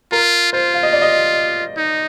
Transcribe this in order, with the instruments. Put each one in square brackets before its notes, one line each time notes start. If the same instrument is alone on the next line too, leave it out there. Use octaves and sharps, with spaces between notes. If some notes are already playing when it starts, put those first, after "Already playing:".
[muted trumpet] F4 [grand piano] A#4
[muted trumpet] F4 [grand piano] C5
[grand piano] F5
D#5
D5
D#5
[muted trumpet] D#4